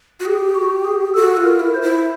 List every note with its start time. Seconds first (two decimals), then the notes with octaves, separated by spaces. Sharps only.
0.20 F#4
0.25 G4 G#4
0.55 F#4
0.85 G#4
1.14 F#4 A4
1.37 F4
1.44 A#4
1.60 E4
1.74 C5
1.82 E4